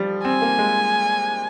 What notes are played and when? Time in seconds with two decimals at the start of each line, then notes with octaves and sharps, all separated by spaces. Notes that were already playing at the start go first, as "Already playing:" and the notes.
Already playing: F3 G3
0.25 C4 G#5
0.42 A#3
0.59 G#3